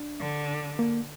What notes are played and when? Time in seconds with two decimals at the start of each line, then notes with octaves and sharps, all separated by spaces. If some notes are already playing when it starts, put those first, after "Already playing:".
Already playing: D4
0.20 D3
0.79 A#3